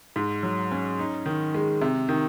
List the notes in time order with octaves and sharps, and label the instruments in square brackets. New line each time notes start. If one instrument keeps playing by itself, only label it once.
[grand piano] G#2
F#3
C#4
D#4
D#3
G#3
C3
D#3